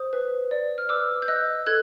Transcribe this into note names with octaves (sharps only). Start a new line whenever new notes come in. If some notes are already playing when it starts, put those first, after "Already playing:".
Already playing: C5 D#6
B4
D5
F6
B4 D6 E6
G6
D#5 E6 F#6
A4 F#6 G#6